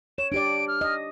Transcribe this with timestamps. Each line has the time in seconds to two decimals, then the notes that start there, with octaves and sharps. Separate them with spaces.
0.18 C#5 E7
0.32 D4 G4 D5 D7
0.68 F6
0.81 D#5